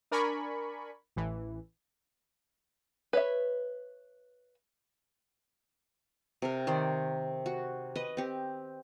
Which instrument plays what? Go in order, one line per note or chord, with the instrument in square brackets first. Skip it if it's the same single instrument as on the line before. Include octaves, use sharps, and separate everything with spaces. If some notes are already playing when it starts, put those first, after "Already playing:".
[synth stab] D4 A#4 D5 G#5 B5 C#6
A1 E3
[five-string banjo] B4 C#5 E5
[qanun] C3 A#4
D#3 C5 D5
F#4
B4 D#5
C4 G4